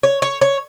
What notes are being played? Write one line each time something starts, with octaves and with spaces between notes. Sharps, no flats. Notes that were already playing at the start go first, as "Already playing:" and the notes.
C#5
C#5
C#5